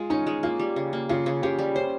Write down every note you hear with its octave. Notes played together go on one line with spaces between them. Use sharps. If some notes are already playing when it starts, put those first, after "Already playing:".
Already playing: G#3 F4
C#4 D#4
G#3
A#3 F4
G3
C#3
A#3
C#3 F4
C#3
C#3 G4
G3
C#4 C5